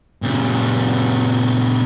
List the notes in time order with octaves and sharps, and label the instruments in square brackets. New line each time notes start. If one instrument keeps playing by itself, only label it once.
[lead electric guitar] A#2 C#3